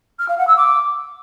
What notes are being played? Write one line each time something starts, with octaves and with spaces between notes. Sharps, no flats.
F6
F5
F#5
E6
D6